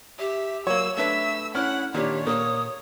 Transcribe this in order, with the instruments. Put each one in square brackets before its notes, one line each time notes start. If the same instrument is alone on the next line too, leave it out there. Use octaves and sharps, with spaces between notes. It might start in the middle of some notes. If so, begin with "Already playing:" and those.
[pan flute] G4 [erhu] E5
[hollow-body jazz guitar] F#3 A#3 [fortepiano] C#5 [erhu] E6
[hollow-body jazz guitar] A3 D4 B4 [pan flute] E5 [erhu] E6
[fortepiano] C#4 F6 [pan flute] E4 [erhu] F#5
[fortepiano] A#2 D4 [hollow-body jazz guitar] D#3 [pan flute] G4 [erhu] C#5
[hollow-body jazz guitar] A#2 [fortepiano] A#3 [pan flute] D#6